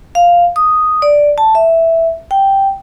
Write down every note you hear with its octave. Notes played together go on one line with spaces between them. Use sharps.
F5
D#6
D5
A5
E5
G5